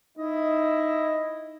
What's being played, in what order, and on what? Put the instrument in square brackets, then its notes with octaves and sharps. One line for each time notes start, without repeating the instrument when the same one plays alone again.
[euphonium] D#4 [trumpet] E4 [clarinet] D#5